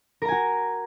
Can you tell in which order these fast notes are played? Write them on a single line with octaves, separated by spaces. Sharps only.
A#4 A#5 G#5 F#4